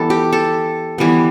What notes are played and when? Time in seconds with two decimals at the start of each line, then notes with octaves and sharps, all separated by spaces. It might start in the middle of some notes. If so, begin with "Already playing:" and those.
Already playing: E3 G3 B3 A4 B4
0.10 G4
0.33 A4
0.98 E3 G3 B3